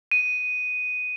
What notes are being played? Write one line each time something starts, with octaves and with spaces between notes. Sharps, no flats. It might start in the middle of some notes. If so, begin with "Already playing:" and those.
D#7